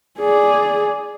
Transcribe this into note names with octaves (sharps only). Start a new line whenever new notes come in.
G#4 D5